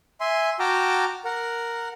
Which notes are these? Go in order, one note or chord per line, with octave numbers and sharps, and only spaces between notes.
E5 G#5 C6
F#4 G5 A5 A#5 D6 F6
A#4 F#5